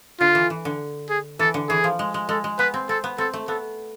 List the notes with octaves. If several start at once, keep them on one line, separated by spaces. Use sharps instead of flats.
D3 F4
E3
E3
D3
G#4
E3 A4
D3
E3 G#4
F3
G#3
G#3
G#3 A4
G#3
B3 B4
C4
C4 A4
B3
C4 A4
A3
B3 A4